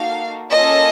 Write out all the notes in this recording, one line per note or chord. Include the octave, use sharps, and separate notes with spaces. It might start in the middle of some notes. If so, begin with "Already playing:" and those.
Already playing: A#3 D#4 F#4 A4 F5
A#3 C#4 F4 A4 D#5